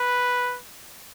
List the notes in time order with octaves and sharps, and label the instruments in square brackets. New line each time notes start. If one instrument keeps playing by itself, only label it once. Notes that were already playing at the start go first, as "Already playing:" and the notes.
Already playing: [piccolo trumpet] B4